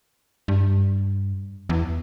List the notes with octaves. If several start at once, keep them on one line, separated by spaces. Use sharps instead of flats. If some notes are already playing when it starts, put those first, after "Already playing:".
G2
E2